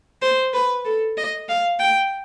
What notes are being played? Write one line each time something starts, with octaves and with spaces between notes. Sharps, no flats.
C5
B4
A4
D#5
F5
G5